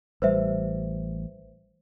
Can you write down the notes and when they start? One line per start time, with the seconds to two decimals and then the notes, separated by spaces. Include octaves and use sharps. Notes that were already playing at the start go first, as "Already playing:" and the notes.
0.22 A1 G3 B4 C5 E5